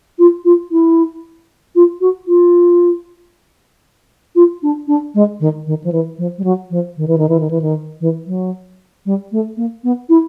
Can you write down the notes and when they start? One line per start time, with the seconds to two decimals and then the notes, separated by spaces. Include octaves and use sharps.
0.19 F4
0.45 F4
0.72 E4
1.75 F4
2.01 F#4
2.28 F4
4.35 F4
4.63 D4
4.88 D4
5.15 G#3
5.40 D#3
5.67 D#3
5.84 F3
5.92 E3
6.18 F3
6.38 G3
6.44 F#3
6.71 F3
6.97 D#3
7.08 E3
7.18 D#3
7.29 E3
7.40 D#3
7.51 E3
7.62 D#3
8.01 E3
8.27 F#3
9.06 G3
9.32 A3
9.57 A#3
9.84 B3
10.09 E4